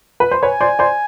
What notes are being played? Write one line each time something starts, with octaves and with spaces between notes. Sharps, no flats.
B4
C5
B4 C#5 G#5
C5 D5
C5 D5